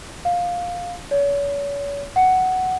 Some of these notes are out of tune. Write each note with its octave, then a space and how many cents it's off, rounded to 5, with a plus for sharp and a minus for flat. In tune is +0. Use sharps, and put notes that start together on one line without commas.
F5 +15
C#5 +40
F#5 +10